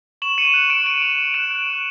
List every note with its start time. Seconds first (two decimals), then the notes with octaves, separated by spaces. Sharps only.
0.22 C#6 E7 F#7
0.38 C#6 C#7 D#7
0.54 F#6
0.70 C#6 D7 E7
0.86 F#6 D7 E7
1.02 C#6 D#7 F7
1.18 C#6 D#7 F7
1.34 F#6 D7 E7
1.51 F#6
1.67 C#6